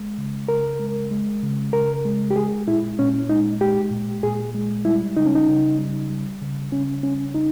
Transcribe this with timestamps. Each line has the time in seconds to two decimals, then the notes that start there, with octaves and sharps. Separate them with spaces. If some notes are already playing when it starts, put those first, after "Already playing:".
Already playing: G#3
0.18 C#3
0.49 C#3 A#4
0.80 G#3
1.11 G#3
1.43 C#3
1.73 C#3 A#4
2.05 G#3
2.31 G4
2.36 G#3 G#4
2.67 A#2 E4
2.99 A#2 C#4
3.29 G#3 D#4
3.61 G#3 G4
3.91 A#2
4.23 A#2 G#4
4.54 G#3
4.85 G3 E4
5.17 C#3 D#4
5.26 C#4
5.35 D#4
5.48 C#3
5.78 G3
6.10 G3
6.42 C#3
6.72 C#3 C#4
7.03 G3 C#4
7.34 G3 D#4